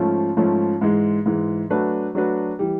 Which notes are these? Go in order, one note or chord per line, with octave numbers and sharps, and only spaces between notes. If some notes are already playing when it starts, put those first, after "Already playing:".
Already playing: G#2 F3 A3 C#4 F4
G#2 F3 A3 C#4 F4
G#2 E3 G#3
G#2 E3 G#3
F#3 A3 D4 F#4 B4
F#3 A3 D4 F#4 B4
E3 G3